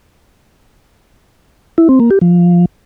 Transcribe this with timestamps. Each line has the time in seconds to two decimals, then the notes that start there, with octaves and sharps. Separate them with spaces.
1.78 E4
1.89 C4
2.00 A#3
2.11 G4
2.21 F3